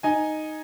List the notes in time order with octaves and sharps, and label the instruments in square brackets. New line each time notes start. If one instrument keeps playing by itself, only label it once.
[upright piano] D#4 G#5